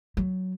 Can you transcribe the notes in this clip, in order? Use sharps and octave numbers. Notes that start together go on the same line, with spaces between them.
F#3